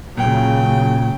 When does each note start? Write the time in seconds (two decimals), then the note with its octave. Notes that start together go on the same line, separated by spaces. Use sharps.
0.17 A#2 C#3 F#3 G5